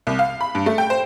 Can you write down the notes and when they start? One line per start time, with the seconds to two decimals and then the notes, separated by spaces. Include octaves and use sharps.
0.07 C2
0.19 F5
0.41 B5
0.55 G2
0.66 A3
0.78 G5
0.90 C5